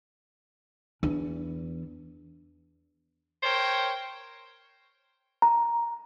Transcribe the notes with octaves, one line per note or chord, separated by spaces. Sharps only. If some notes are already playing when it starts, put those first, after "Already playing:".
E2 D4
A#4 C5 C#5 G5
A#5